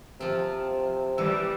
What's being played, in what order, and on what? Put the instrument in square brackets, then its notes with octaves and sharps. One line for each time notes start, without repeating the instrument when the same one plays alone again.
[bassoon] C3 [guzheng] F3 C4
[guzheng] E3 [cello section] G3 [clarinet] E6